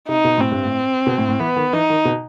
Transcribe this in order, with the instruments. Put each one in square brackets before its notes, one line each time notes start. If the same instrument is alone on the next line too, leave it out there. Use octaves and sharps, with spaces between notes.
[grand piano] C3 [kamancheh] D#4
[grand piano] B2
[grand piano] A2 [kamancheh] C4
[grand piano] G2
A2
B2
A2
A2
[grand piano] E3 [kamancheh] B3
[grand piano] D#3
[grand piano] E3 [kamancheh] D#4
[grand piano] D#3
B2